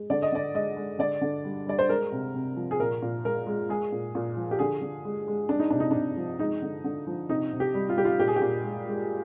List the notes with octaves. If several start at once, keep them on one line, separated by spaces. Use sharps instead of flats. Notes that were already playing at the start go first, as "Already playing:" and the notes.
Already playing: G#3
D3 D5
D#5
D3 D5
G#3 D#5
G#3
D3 D5
D3
G3
G3 D5
C5
G#3 A#4
C3
C3
F3
G#4
A#2 A#4
A#2
G#3 A#4
G#3
G#3 G#4
A#2
A#2
F3
G4
D3 G#4
D3
G#3
G#3
G#3 D4
D#4
C3 D4
D#4
C3 D4
F3
G#3 D#4
D3
D3
F3
C3 D#4
C3
G4
G3
F4
G3 G4
F4
A#2 G4
G#4
G4
A#2
G#3
G#3